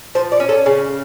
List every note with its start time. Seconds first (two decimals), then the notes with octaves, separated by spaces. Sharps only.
0.15 F3 C5
0.32 D5
0.40 C#4
0.49 A4
0.66 C#3